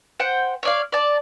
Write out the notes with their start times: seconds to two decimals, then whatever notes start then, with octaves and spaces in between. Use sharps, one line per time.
0.20 C5 F#5 G5
0.63 C#5 D5 F5
0.92 D5 A5